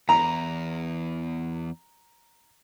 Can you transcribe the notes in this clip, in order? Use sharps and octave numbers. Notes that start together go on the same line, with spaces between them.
E2 A#5